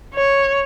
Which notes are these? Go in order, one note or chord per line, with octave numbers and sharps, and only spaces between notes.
C#5